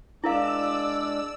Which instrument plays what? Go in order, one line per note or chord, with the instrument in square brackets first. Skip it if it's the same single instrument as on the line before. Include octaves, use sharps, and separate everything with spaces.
[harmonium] G#3 D4 [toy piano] E4 A#4 F5 [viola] D5 [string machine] E6